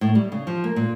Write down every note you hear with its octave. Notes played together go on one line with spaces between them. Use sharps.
A2
G3
C#3
F3
A#3
A#2